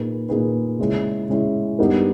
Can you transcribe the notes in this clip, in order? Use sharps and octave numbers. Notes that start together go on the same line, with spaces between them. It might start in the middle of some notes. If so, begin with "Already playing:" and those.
Already playing: A#2 A#3 D#4 G#4 B4
A#2 A#3 D#4 G#4 B4
C#3 G#3 C#4 E4
C#3 G#3 C#4 E4
G2 G3 B3 D#4 A#4